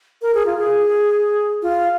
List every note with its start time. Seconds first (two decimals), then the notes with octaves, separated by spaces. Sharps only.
0.22 A#4
0.34 G#4
0.46 F4
0.58 G#4
1.62 F4